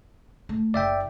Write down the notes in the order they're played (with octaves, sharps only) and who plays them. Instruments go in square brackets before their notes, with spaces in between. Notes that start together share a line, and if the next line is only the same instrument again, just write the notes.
[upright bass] A3
[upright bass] F#1 [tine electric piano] D5 E5 G5